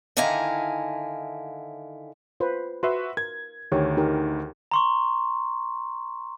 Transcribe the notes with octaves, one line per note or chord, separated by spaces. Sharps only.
D3 D#3 E4 F5 G#5 A#5
F4 B4 C5
F#4 B4 E5 C6
A#4 G#6
D2 D#3 G4 C#5
D#4 G4 A#4
A#5 C6 C#6